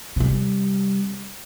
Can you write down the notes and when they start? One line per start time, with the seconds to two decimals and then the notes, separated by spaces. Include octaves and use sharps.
0.16 C3 G3